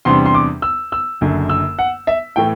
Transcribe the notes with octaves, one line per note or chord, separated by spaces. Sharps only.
E2 C3 G3 D4 C6
C6
D6
E6
E6
F#1 F#2 D3
E6
F#5
E5
A2 E3 A3 G5